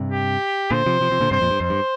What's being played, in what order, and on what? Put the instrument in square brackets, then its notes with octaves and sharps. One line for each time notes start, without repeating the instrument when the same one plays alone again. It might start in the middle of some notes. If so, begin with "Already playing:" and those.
Already playing: [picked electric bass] G2 C3
[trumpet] G4
[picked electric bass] A#2 D3 [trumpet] C5
[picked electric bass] C3 F3
C3 F3
C3 F3
A#2 D3
[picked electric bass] G2 C3 [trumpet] C5
[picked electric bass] F2 A#2
G2
[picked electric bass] F2 [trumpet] C5
[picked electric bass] G2